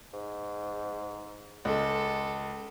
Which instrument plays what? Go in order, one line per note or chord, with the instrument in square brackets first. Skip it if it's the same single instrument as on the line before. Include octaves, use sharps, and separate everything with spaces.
[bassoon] G#2
[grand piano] C#2 [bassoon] G#3 [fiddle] A4